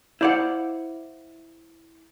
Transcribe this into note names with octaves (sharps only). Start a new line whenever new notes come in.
E4 C5 D5 F5 F#5